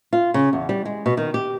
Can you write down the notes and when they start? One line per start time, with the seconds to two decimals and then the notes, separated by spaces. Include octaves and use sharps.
0.13 F4
0.34 C#3
0.53 E2
0.69 G3
0.85 G#3
1.06 B2
1.17 D#3
1.34 G4